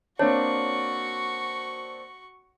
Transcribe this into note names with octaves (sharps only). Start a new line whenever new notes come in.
A#3 C4 D4 F#4 C#5 C#6